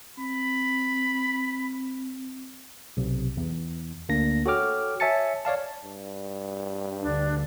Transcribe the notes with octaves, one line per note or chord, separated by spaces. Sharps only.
C4 B5
B1 C3
E2
D2 A#3 D4 A#6
F#4 A4 C#5 G5 D6 F6
C#5 E5 G#5 A5 A6 C#7
C#5 D5 F5 A5
G2
D2 D3 D4